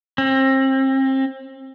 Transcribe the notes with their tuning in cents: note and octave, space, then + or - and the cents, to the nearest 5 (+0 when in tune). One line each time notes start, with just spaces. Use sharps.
C4 +35